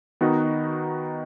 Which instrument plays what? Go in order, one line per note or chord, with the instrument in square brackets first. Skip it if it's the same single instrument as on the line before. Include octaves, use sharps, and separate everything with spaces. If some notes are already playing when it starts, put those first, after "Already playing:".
[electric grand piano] D#3 B3 D#4 F#4 D#5